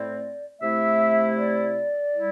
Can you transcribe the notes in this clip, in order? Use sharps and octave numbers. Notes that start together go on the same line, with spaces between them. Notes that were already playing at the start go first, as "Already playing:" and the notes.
Already playing: A2 A3 C4 E4 D5
C3 A3 E4 E5
D5
G3 E4